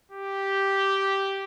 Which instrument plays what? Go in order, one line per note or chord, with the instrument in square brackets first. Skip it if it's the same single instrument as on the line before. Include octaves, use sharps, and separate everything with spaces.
[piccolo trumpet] G4